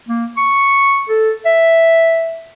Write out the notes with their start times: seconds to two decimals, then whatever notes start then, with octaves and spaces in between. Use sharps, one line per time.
0.08 A#3
0.37 C#6
1.09 A4
1.45 E5